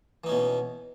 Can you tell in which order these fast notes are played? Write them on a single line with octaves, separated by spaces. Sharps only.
E3 D#4 C#4 B2